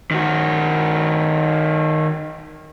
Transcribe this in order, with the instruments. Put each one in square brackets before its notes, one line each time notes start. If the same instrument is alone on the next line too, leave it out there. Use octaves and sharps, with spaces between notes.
[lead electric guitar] D#3 F#4